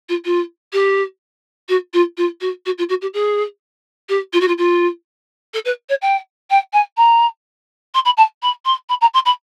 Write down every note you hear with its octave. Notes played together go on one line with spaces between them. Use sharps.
F4
F4
G4
F#4
F4
F4
F#4
F#4
F4
F#4
G4
G#4
G4
F4
F#4
F4
F4
A4
B4
C#5
G5
G5
G#5
A#5
C6
B5
A5
B5
C6
B5
A#5
C6
B5